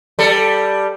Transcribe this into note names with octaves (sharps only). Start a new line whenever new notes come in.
G3 A4